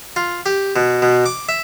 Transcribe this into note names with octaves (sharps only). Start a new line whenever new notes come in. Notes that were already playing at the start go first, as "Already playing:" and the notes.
F4
G4
B2
B2
D6
E5